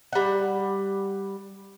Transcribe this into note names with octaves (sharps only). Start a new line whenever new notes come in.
G3 F#5